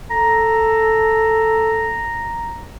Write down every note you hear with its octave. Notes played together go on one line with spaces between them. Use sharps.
A4 A#5